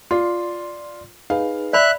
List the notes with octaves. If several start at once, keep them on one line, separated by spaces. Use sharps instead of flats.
F4 D5 C6
D#4 G#4 B4 F5
D5 E5 B5 F#6